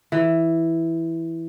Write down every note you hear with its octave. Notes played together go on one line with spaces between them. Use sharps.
E3